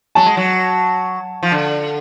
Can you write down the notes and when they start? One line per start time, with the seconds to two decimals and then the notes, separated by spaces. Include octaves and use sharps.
0.15 F#3 A5
0.26 G#3
0.37 F#3
1.43 F3
1.52 D3